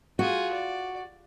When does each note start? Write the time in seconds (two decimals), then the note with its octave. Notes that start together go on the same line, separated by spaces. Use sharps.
0.19 F4 F#4 G#4
0.53 D5